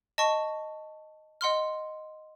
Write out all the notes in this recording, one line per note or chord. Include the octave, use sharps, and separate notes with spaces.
D#5 A5 C#6
D#5 F#5 C6 F6